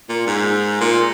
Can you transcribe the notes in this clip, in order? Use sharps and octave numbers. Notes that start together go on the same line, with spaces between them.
A#2
G#2
A#2